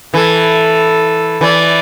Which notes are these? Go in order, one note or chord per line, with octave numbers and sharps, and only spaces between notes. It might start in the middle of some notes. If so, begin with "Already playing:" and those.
E3 A4
E3 D5